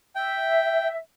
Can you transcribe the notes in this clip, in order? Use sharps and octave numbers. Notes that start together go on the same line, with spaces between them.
E5 G5